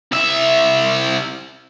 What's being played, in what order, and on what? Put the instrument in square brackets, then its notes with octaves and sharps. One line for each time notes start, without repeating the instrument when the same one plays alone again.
[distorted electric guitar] C2 E5